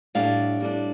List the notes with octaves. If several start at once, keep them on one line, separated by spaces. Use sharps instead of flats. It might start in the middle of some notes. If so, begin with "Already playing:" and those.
A2 G3 D4 F5
A2 G3 D4